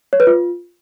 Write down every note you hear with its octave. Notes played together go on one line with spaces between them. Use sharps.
C#5
B4
F4